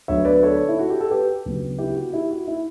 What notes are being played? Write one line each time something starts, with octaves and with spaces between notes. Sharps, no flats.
D2 D3 F#3 B3 C#5 E5
B4 D5
A4 C#5
E4
F#4
G4
A4
G4 B4
D2 C#3 F#3 B3
E4 G4
F#4
E4 G4
F#4
E4